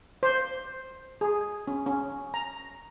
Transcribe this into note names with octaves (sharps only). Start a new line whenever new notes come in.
C5
G#4
C#4
C#4
A#5